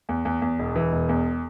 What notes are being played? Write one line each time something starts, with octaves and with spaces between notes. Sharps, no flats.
E2
E2
E2
E1
E3
E1
E2